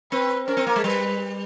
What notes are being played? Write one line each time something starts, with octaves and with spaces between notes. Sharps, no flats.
C4 B4
C#4 A#4
C4
A#3
G#3
G3 B4